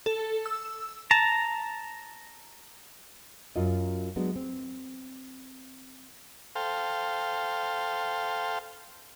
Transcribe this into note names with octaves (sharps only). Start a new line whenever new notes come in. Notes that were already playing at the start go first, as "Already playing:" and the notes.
A4
E6
A5 A#5
F#2 F#3 F4 D#5
F#3 G#3 B3 D4
C4
A4 C5 F5 G5